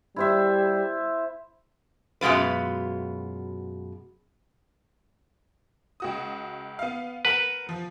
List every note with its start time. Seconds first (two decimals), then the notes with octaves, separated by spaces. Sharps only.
0.16 G3 E4 C5 E5
2.21 F#2 B2 G#3 F4 B4
6.00 C#2 F#4 D#6
6.79 B3 F5
7.25 A#4 B4 F#5
7.69 F3